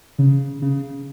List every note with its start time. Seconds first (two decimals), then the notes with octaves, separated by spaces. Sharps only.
0.19 C#3
0.62 C#3